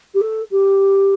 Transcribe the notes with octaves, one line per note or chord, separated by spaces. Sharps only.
G4
A4
G4